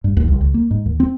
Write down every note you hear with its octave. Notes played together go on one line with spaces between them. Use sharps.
G2
D#2
C2
C#2
A#3
G#2
D#2
C4